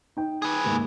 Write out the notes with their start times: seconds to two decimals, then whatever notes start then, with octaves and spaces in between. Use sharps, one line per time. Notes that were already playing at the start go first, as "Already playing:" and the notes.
0.17 D#4 G5
0.42 G#4 B4
0.64 F#1 D#2 G#2